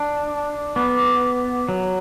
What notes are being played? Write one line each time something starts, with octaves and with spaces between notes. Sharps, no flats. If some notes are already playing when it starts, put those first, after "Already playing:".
Already playing: D4
B3 D6
F#3